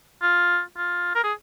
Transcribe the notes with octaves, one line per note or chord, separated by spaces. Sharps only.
F4
F4
A#4
G#4